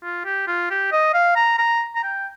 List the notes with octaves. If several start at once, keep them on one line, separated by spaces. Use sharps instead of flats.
F4
G4
F4
G4
D#5
F5
A#5
A#5
A#5
G5